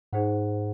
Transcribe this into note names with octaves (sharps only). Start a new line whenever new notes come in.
G#2 D#4 G#4 C5 F#5